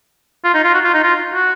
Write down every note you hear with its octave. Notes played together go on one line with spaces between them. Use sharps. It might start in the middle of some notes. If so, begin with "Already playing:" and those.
F4
D#4
F4
F#4
F4
D#4
F4
F#4